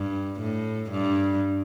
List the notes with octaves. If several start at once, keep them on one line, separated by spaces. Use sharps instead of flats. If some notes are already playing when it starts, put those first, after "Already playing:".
Already playing: G2
A2
G2